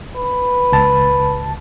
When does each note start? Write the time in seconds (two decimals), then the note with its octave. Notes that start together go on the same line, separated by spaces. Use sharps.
0.16 B4
0.72 C#2 A5